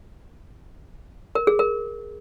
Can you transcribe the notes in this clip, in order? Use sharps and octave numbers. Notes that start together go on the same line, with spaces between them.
A#4
G#4
A#4